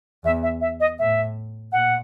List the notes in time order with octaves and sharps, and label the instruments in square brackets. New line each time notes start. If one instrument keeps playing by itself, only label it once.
[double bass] E2 [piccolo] E5
[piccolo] E5
E5
D#5
[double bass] A2 [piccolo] E5
[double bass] A#2 [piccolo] F#5